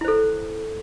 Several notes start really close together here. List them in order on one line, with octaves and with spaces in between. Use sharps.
E4 C5 A4